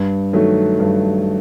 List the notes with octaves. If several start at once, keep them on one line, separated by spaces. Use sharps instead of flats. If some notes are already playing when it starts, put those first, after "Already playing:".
Already playing: G2
D#3 F#3 A3
G2